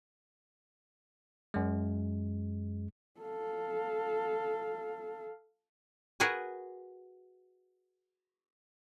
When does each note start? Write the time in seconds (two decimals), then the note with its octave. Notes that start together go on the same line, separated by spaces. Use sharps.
1.54 F#2 G#3
3.20 A4 F5
6.20 F#4 G#4 A#4 B4 G#5